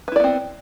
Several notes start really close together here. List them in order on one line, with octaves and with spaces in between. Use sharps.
B4 E4 D5 B3 C4